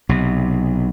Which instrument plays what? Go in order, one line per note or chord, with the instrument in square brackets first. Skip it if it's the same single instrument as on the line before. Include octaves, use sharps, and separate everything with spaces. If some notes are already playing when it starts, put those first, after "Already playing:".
[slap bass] B1 C3